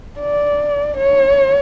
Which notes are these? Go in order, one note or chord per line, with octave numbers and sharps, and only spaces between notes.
D5
C#5